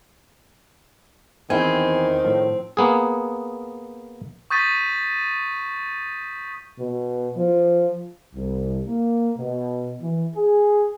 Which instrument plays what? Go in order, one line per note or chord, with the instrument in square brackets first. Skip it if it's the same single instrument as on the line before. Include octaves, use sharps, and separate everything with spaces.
[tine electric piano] E2 E4 G#5 [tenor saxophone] D#3 [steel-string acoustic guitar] C4
[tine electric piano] A2 F3
[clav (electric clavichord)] A#3 B3 G#4
[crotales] C#6 D#6 G6 A6 B6 D#7
[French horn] B2
F3
[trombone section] C2
A#3
B2
E3
G#4